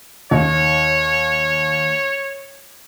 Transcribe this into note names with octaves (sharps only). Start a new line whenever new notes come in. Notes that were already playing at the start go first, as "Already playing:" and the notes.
D#2 C#5